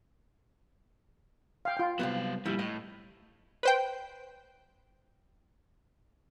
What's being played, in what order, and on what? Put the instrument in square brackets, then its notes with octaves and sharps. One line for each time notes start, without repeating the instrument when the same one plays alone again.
[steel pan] F5 G5
F4 G5
[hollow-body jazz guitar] C2 G2 B3 [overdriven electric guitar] F#3 F5
[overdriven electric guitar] F2 A#2 [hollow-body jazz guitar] G3 E4
[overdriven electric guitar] A2 [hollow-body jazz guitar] D#5
[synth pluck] B4 C5 G5